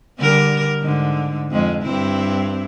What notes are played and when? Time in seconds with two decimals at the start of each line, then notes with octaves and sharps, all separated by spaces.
0.18 D3 G3 A#4
0.82 G#2 D3
1.50 F2 G#3
1.83 G2 C4 E4